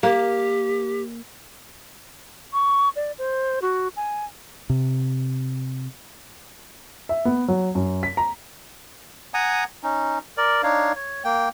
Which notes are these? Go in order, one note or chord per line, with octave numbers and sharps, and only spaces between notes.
A#3 G4
C#6
D5
C5
F#4
G#5
C3
E5
B3
F#3
F#2
B6
A#5
F#5 G#5 A#5 D#6
C#4 D#4
A#4 D5
D4 D#4 C#5 F5
C#5
A#3 G5